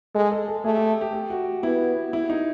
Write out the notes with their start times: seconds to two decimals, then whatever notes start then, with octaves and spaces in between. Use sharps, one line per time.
0.15 G#3 A4
0.32 A4
0.48 A4
0.64 A3 G#4
0.76 G4
1.01 G4
1.13 G4
1.30 F#4
1.63 B3 E4
2.13 E4
2.30 D#4